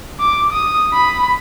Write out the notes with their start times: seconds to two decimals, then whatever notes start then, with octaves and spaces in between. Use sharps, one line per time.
0.20 D6
0.52 D#6
0.93 B5